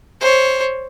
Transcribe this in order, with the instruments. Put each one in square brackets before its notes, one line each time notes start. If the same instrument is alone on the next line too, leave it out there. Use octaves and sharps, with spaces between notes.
[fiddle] C5 C#5